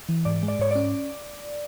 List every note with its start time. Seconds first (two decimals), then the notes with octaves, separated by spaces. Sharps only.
0.09 E3
0.25 G#2 D5
0.43 G#3
0.48 D5
0.59 G#2 C#5
0.71 C#4 D5